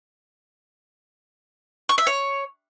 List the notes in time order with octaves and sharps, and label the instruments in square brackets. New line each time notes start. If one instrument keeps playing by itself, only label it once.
[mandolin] C#6
E5
C#5